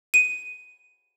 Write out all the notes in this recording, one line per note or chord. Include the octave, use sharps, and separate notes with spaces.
D#7